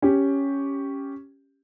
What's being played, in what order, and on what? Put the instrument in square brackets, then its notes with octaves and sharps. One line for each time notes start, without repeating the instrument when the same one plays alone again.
[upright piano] C#4 G4